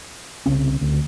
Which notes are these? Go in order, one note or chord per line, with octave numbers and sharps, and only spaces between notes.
C2 C#3 C4 C#4
D2